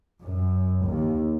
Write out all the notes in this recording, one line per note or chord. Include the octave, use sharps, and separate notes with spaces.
F#2
D#2